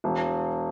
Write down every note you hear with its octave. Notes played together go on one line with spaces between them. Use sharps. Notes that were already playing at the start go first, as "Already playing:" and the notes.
E1